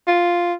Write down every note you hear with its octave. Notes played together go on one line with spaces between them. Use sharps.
F4